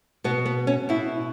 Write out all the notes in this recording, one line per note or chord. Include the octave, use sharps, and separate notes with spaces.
B2 B3
B3
C#4
B2 E4